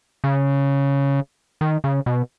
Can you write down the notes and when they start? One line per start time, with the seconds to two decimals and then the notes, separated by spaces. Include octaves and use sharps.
0.24 C#3
1.61 D#3
1.84 C#3
2.06 B2